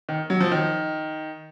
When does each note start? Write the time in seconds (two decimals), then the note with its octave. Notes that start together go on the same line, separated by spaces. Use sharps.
0.09 D#3
0.30 F#3
0.41 F3
0.52 D#3